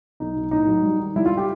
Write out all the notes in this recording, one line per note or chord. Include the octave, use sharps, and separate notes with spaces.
B1 D#4
B1
A2 D#4
F#3
G3
D#3
G3 E4
F4
G4